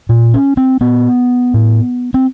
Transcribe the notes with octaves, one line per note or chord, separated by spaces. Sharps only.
A#2
C#4
C4
A#2 B3
A2
C4